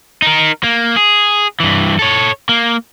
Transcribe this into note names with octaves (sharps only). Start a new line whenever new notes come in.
D#4 A#4
A#3
G#4
G2 E3
A4 C#5
A#3